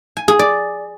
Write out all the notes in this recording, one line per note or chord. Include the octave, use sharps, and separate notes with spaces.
G#5
G#4
D5